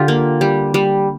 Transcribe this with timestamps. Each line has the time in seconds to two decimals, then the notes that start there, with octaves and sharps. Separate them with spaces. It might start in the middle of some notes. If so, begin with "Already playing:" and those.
Already playing: D3 F4 G4
0.08 A#3
0.41 G3
0.74 G3